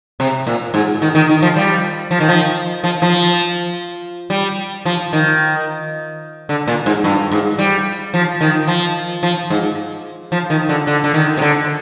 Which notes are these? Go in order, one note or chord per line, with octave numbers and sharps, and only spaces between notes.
C3
A#2
G#2
D#3
D#3
D#3
F3
G3
F3
D#3
F3
F3
F3
G3
F3
D#3
D3
A#2
G#2
G2
G#2
G3
F3
D#3
F3
F3
G#2
F3
D#3
D3
D3
D3
D#3
C3
D3